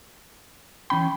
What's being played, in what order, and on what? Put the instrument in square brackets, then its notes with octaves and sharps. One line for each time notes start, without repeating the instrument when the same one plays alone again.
[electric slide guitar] E3 C#4 G5 [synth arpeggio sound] B5